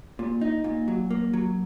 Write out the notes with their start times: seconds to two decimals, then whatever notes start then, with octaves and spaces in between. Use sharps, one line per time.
0.19 A#2
0.41 D#4
0.64 A#2
0.88 F#3
1.10 A#3
1.33 F#3